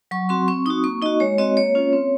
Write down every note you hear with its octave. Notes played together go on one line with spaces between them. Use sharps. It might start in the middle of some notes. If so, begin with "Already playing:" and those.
F#3 C#6
C4 F#4 C6
C4 C#6
D#4 F#4 D#6
A#3 C#6
D#4 F#4 D#5
G#3 C#5
C4 F#4 D#5
A#3 C#5
C#4 F4
C4